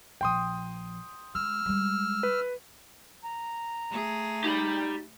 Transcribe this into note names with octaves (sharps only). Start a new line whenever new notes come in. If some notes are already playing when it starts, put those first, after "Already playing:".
A#1 F3 G5 C6 D#6
G#3 E6 F6
G3 G#3
B4
A#5
A3 G#4
D#4 G4 B5